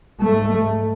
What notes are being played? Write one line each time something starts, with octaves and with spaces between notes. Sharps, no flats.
G#2 A3